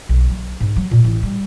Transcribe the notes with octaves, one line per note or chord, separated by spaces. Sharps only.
B1
F#3
G#2
F#3
A#2
A1
G3